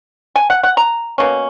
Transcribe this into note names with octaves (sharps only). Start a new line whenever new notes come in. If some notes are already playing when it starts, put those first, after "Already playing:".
G#5
F#5
F#5
A#5
B2 A#3 C#4